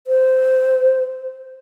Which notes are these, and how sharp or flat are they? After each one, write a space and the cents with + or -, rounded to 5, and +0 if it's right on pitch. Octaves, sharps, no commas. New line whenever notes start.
C5 -15